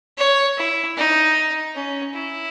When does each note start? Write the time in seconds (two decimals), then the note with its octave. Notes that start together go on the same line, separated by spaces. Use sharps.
0.18 C#5
0.57 E4
0.97 D#4
1.75 C#4
2.14 E4